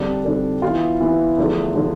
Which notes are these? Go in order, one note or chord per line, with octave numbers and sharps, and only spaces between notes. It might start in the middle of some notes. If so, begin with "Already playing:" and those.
Already playing: F2 D3 G3 D4 A4
F2 D3 G3 D4 A4
E3 B3 F4
E3 B3 F4
E2 D3 F3 A3
D3 F3 A3